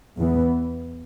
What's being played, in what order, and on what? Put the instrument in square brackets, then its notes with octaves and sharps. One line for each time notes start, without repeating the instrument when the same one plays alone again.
[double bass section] E2 E3 B3